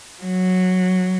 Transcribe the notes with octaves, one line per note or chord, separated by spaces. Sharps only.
F#3